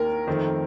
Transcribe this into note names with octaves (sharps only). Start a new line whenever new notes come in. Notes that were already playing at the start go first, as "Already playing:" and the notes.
Already playing: D#2 D#3 A#3 A#4
F2 D#3 A3 C4